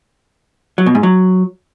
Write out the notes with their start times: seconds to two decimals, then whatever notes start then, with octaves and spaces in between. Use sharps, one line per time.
0.78 F#3
0.86 B2
0.95 G#2
1.03 F#3